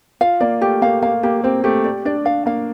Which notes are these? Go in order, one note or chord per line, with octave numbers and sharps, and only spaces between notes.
F4 F5
A#3 D5
A3 G4
A#3 F5
A#3 F5
A#3 G4
C4 G4
A3 G4
D5
D4 D5
D4 F5
A#3 F5